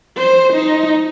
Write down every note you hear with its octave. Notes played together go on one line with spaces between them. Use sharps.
C5
D#4